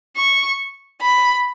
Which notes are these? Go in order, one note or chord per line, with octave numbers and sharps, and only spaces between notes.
C#6
B5